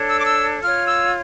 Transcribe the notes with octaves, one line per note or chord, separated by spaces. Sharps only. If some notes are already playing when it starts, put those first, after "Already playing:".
Already playing: D4 A4 C#5
E6
D6
E6
F4 C#5 F6
E6